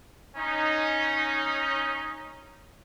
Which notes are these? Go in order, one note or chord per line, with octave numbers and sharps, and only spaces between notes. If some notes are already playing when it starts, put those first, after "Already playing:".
C#4 D#4